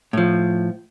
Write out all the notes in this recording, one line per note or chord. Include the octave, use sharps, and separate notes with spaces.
A2 F3